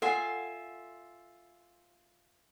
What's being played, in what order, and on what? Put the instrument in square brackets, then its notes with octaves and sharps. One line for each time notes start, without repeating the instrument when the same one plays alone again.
[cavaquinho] F4 E5 G#5 [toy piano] A4 F#5